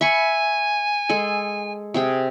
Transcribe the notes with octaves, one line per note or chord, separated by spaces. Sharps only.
E5 G#5 B5 C#6
G#3 G#4 A4
C3 G#4 G5